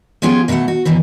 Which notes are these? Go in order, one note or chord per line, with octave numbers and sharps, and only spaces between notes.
F3 B3 C#4 F4 G4 G#4
B2 E3 F#3 A3 F#5
F#4
F#2 B2 D#3 E3